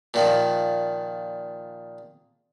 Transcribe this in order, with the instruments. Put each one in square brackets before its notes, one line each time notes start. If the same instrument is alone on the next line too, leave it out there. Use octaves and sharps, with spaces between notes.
[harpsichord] A#2 D#3 F3